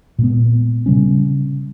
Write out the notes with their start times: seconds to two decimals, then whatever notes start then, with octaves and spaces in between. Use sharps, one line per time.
0.19 A#2 G#3 B3
0.86 C#3 G3 C#4